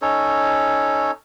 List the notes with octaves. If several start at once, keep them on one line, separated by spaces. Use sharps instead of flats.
C#4 D#4 A4 C#5